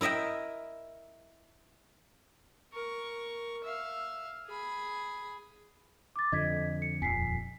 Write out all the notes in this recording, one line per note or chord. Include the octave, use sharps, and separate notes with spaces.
E4 A#4 D#5 E5 G5
A#4 C#6
E5 F5
G#4 B5
D6 A6
F2 D3 D#5 G#6 B6
C#7
D#1 F2 G#5 B6 C7